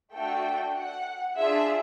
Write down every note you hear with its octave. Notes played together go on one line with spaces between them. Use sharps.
A3 D4 F#4 A4 G5
F#5
D4 F4 G#4 E5